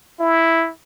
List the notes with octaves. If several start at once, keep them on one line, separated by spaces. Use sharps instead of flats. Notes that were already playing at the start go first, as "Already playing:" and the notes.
E4